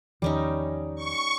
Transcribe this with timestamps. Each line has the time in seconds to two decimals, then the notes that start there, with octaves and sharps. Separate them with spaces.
0.22 E2 D#3 F3 G3 C#4 D#4
0.95 C#6